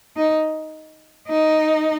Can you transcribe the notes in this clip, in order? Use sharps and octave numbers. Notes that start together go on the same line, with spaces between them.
D#4
D#4